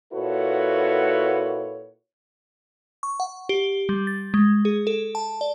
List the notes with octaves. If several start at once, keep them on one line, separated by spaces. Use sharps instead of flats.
A#2 E4 F#4 A4 B4 C#5
C#6
F#5
G4
G3
A6
G#3
G#4
A4
A5
D5